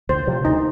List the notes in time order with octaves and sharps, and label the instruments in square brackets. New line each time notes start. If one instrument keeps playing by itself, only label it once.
[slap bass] D2 [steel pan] C5
[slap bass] C3 F3
[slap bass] D2 [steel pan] D#4